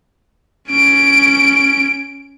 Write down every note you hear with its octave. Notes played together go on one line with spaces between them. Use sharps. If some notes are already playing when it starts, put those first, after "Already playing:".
C#4 D7